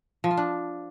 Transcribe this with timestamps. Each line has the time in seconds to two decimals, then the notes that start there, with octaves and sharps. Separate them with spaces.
0.24 F3
0.31 F4
0.37 D4